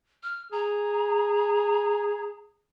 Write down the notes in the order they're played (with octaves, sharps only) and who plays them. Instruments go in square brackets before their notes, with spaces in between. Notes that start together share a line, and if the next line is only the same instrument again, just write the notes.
[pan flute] F6
[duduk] G#4 [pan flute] A#5